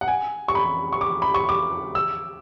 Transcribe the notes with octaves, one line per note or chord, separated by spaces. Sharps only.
F#5
G#5
C#6
B5
C#6
D6
B5
C#6
D6
E6